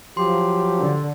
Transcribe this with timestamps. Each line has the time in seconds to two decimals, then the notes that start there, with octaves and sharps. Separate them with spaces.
0.17 F3 F#3 G4 C6
0.80 D3